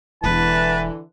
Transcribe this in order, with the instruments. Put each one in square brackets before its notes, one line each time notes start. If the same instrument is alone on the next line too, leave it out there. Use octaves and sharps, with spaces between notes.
[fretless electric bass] E1 E2 [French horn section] D3 E3 [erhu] B4 [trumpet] A5